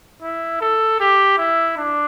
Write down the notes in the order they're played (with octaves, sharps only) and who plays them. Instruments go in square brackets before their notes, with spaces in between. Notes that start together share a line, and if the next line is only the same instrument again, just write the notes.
[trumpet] E4
A4
G4
E4
D4